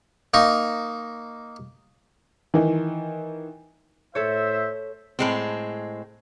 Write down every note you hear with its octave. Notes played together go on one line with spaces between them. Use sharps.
A#3 D#4 A#5 C#6
D#3 E3
A2 A4 C5 C#5 E5
A2 G#3 C4